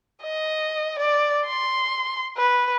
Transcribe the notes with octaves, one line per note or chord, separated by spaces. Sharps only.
D#5
D5
C6
B4